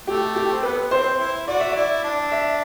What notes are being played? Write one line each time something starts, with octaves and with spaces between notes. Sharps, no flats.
A3 G4
G4
C4
B3 B4
C4 C5
E4
F#4 D5
E5
E4 D5
D4
E5